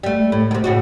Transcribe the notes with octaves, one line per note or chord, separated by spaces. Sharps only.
G3 A3
A2
C3 D#3
A2 C#3 F#4